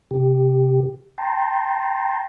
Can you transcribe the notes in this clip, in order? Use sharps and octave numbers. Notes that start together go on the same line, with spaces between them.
C3 G4
G5 A5 A#5 C6